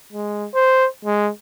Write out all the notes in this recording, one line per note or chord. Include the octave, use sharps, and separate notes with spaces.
G#3
C5
G#3